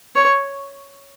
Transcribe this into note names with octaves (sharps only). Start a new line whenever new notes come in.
C#5